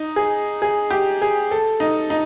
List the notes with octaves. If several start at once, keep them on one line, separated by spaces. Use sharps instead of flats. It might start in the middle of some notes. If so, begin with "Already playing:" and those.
Already playing: D#4
G#4
G#4
G4
G#4
A4
D#4
D#4